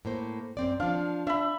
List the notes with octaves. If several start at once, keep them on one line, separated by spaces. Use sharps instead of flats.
A2 A#3 C5
F#2 C4 D5
F3 D4 F5
D4 E5 B5